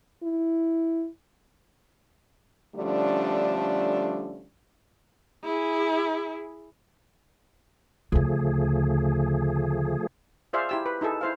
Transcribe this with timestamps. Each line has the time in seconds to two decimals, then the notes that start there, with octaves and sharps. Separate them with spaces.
0.23 E4
2.76 D3 F3 G3 A3 C#4 D4
5.44 E4 G#4
8.12 D2 C#3 F3 A3 G#4
10.53 F4 G#4 C5 D5 E5 F5
10.69 E4 G4 E6
10.86 B4
11.01 D#4 E4 G#4 A4
11.21 E4 C5 F5